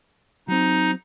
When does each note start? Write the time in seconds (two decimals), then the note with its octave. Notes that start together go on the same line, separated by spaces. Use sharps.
0.48 F#3 C4 D#4